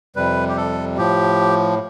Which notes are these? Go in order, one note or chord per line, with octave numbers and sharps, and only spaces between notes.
F2 C3 G3 B4
G4
A4
A2 F3 G4